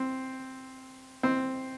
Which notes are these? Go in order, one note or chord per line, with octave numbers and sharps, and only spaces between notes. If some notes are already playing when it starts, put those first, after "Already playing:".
Already playing: C4
C4